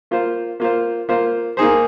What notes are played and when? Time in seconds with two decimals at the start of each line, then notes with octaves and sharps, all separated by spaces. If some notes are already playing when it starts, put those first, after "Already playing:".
0.11 A#3 F4 C5
0.60 A#3 F4 C5
1.09 A#3 F4 C5
1.57 A#3 D#4 G#4 C5